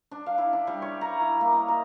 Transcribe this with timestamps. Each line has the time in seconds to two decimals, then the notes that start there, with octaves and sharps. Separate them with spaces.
0.11 D4
0.26 F5
0.38 E4
0.53 D4
0.67 G3
0.82 C#5
1.01 A#5
1.21 E4
1.41 A#3
1.53 D#5
1.68 A#5